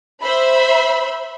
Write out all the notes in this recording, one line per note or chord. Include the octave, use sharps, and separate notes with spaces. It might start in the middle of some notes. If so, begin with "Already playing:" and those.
C5 E5 B5